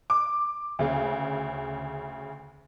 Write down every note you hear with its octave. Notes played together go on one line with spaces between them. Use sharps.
D6
D2 C#3